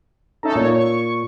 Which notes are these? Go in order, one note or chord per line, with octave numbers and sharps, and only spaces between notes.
C#4 D#4 A4 E5 A#5
A#2 C#5
C#6